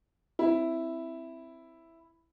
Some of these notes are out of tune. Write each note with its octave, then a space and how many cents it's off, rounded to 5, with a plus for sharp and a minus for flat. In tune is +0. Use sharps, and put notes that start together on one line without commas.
C4 +0 E4 +0